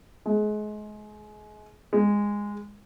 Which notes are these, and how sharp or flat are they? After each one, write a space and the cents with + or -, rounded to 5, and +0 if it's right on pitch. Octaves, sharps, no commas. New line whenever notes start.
G#3 +30
G#3 -15